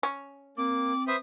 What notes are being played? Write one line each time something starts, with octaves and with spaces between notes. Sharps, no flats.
C#4
A#3 C4 D6
B4 C5 E5 D#6